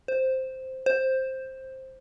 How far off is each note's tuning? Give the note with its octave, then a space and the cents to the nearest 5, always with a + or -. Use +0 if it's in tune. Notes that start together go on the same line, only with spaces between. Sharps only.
C5 +0
C5 +10